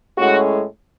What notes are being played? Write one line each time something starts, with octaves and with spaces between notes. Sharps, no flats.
A2 G#3 C#4 F#4